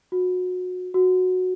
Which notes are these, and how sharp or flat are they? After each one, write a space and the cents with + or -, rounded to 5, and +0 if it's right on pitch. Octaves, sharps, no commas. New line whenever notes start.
F#4 -25
F#4 -10